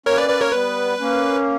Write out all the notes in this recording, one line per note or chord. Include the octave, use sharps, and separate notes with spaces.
A#3 C#4 A#4 C#5
B4 D5
B4 D5
A#4 C#5
G3 B3 B4
A#3 C#4